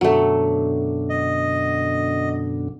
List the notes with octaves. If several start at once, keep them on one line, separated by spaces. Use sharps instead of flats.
F#2 B2 D3 F#3 A3
D#5